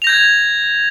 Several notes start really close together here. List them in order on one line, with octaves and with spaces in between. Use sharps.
F7 A#6 G6 G#6